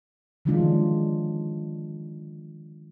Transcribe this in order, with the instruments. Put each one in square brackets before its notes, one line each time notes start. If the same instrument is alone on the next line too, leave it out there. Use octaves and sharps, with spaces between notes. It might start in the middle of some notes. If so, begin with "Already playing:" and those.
[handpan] D#3 F3 F#3 G#3 D4 F4